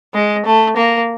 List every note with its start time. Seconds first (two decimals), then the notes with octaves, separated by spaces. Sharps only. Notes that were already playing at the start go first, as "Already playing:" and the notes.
0.14 G#3
0.46 A3
0.77 A#3